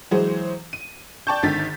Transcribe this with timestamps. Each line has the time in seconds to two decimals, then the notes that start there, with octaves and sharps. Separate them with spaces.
0.11 E3 F#3 G#3 G#4 C5
0.73 D#7
1.27 D5 G5 A5 C#6 G6
1.43 G#1 D3 D#3 A6 B6